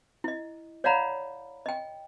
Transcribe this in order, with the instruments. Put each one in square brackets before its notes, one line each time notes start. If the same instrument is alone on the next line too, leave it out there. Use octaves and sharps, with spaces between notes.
[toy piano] E4 D#5
C#5 D5 F5 F#5 A#5 B5
D#5 G5